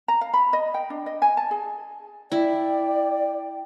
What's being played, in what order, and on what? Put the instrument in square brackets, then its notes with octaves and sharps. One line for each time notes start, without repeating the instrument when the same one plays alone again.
[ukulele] A#5
F5
B5
D#5
G5
D4
D#5
G#5
A5
G#4
[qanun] E4 [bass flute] D5 [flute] G5